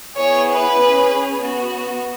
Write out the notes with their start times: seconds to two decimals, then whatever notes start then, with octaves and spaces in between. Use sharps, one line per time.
0.18 B3 E4 G#4 C#5
0.49 B4
0.80 C#4 G#4
1.42 B3 F#4